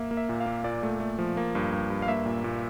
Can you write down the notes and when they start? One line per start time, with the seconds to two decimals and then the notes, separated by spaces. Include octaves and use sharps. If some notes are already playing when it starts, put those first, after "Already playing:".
Already playing: A#3 E5
0.11 A#3
0.17 E5
0.29 A#2
0.40 F5
0.46 A#3
0.64 A#2 D5
0.83 A3
1.00 A3
1.19 F3
1.37 A#3
1.55 G2
1.73 G2
1.90 G2
2.02 F5
2.08 A#3 E5
2.26 A#2
2.44 A#2